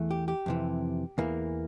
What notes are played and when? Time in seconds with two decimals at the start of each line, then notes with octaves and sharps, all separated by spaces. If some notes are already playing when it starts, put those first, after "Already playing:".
Already playing: E2 E3 A3
0.11 G4
0.28 G4
0.46 F2 C3 E3
1.18 E2 E3 A#3